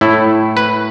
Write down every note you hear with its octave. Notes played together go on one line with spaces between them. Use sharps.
A2 A3 E4
B4